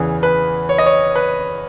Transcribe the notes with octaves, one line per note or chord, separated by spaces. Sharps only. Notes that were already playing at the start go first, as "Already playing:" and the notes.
Already playing: E2 C#3 E3 G#4
B4
C#5
D#5
C#5
B4